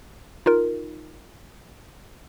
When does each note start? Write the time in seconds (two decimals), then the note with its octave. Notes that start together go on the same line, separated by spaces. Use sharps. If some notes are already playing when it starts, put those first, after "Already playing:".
0.46 D#4 F4 A#4